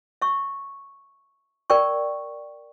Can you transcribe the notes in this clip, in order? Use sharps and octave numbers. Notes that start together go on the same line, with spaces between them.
E5 C#6
A#4 D5 G5 C#6